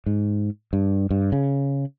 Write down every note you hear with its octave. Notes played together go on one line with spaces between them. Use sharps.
G#2
G2
G2
C#3